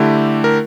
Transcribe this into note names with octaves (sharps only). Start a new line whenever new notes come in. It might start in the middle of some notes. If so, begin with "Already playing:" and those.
Already playing: D3 A3 E4 G4
A#4